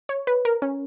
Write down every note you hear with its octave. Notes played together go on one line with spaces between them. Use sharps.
C#5
B4
A#4
C#4